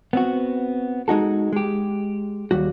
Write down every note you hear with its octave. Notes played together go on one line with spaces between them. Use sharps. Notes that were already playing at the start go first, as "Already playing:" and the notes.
B3 C4 F#4
G#3 D#4 F#4 A4
G#3 G4
D#2 G3 F#4